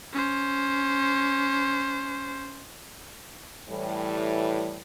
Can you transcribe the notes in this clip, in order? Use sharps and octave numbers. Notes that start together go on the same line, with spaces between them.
C#4 C5
A2 E3 G3